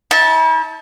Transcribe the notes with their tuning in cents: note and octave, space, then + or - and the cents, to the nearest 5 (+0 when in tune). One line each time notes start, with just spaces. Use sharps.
E4 -45 A5 +0